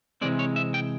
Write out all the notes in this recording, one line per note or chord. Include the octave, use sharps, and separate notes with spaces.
C3 E3 G#3 C4 D5
C#5
E5
G5